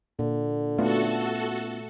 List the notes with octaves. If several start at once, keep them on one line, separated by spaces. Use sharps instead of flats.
A#2 D3
A3 B3 C#4 F4 F#4 A4